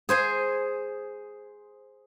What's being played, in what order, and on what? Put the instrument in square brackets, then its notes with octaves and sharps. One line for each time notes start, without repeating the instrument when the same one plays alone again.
[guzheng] G#4 C5 G#5